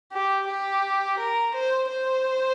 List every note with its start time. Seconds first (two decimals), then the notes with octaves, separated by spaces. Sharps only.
0.13 G4
0.48 G4
1.19 A#4
1.54 C5
1.90 C5